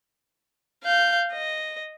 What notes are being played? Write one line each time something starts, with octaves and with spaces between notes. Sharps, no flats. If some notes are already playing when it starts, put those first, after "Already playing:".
F5 G6
D#5